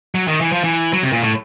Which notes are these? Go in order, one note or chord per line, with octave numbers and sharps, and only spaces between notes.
F#3
D#3
E3
F3
E3
F#3
C3
A#2
A2